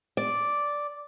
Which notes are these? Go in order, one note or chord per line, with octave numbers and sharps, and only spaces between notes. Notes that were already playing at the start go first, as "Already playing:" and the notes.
D5